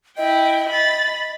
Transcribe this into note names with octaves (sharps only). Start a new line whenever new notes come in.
E4 D#5 G5
B5 A6